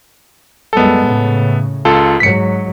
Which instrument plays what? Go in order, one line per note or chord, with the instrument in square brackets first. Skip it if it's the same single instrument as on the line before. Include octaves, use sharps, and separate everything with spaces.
[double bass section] F#2 G3 G#3 [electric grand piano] B3 A4
[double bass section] A2 C#3
[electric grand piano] C#2 F4 A4
[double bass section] G#2 F#3 [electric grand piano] B6 C#7